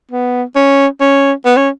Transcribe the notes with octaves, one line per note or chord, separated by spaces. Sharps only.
B3
C#4
C#4
B3
C#4